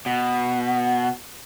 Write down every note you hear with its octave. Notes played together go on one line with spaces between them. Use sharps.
B2